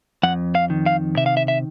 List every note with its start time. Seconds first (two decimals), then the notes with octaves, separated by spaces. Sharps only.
0.23 F2 F#5
0.55 F5
0.70 D#3
0.86 F5
1.17 C3 E5
1.26 F5
1.37 E5
1.48 E5